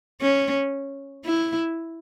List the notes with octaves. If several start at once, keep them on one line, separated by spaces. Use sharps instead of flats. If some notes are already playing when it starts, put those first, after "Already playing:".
C#4
E4